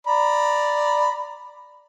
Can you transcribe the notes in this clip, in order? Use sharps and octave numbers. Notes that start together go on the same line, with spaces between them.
D5 A#5 B5